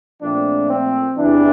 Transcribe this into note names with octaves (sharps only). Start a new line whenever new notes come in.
A#2 F3 A3 C4 D4
C4
E2 C3 E3 D4